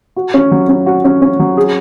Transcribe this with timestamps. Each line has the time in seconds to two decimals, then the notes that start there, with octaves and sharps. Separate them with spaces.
0.16 F#4
0.34 C#4
0.51 F#3
0.69 C#4
0.86 F#4
1.04 C#4
1.22 C#4
1.39 F#3
1.57 G#4